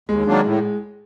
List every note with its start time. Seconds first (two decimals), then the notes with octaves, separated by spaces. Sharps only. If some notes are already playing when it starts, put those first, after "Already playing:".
0.09 D#2 G#3
0.27 D#3 F#3 A#3 D4
0.45 A2